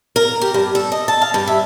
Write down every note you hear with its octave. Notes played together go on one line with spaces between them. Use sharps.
A#4
G4
G2
A4
D#5
A5
F5
G2
E5